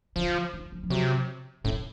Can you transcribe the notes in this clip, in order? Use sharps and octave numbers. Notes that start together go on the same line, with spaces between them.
C#3 F3
D#3
F3
F3
C3 F#3
A2 C#4